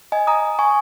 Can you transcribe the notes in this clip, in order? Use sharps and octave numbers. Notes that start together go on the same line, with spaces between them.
D#5 G#5
A#5 D#6
G#5 C#6